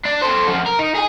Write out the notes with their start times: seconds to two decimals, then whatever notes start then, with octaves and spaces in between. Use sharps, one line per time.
0.06 D4
0.22 A4 C5
0.48 F#2 F3
0.66 A#4
0.79 D#4
0.94 G#4 G#5